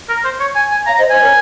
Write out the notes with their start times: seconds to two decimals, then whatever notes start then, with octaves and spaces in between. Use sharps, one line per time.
0.09 A#4
0.25 C5
0.40 C#5
0.55 G#5
0.71 G#5
0.87 C#5 F5 A#5
0.98 C5 D#5
1.10 C5 D#5 G#5
1.22 A#4 C#5